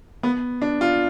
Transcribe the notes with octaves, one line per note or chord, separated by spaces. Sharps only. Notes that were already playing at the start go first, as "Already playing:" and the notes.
B3
D4
F4